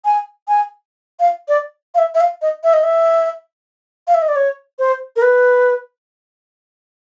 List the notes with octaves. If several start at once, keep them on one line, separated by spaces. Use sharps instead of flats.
G#5
G#5
F5
D5
F5
E5
E5
F5
D#5
E5
D#5
E5
F5
E5
D#5
D5
C#5
C5
A#4
B4